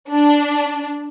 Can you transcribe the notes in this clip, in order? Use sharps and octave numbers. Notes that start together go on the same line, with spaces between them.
D4